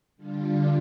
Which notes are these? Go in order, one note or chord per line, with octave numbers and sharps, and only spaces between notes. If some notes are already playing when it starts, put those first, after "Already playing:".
D3 G3 D4 F4